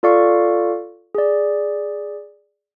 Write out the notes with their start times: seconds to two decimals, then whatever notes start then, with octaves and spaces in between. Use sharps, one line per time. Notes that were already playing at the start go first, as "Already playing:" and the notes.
0.03 F4 A4 D5 F5 C#6
1.15 G#4 D5